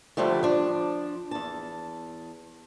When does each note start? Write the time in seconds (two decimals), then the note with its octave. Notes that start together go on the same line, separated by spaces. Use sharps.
0.17 D3 F3 G3 A3
0.43 F3 D4
1.31 E2 A5